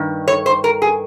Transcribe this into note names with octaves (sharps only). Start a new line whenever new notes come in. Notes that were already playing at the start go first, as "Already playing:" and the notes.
Already playing: G2 D#3
C#5
C5
A#4
G#4